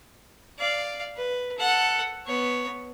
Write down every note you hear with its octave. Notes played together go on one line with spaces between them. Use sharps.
D5 F5
B4
A4 F#5
B3 C#5